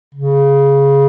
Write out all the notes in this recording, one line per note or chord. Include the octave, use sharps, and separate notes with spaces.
C#3